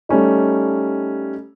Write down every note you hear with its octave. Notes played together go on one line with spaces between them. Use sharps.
G3 A3 C#4 D#4